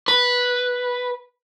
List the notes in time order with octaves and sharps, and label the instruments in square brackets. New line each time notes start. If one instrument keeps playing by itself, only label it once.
[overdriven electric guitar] B4